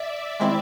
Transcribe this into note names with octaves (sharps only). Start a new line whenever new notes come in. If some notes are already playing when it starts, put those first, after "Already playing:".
Already playing: D5 E5
D#3 G#3 C4 E4